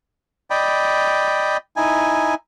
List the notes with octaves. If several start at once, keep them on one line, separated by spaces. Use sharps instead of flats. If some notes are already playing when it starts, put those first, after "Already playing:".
D5 D#5 G5 B5
D#4 E4 G#5